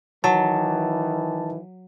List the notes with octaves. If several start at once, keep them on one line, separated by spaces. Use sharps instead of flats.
D#3 E3 F#3 A5